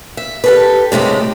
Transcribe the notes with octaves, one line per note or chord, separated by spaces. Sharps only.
E5
G4 A4 B4
A2 C3 G#3 A3 G4